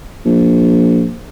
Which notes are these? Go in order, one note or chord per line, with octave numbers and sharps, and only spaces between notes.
A#1